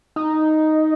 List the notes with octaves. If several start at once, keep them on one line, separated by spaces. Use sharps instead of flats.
D#4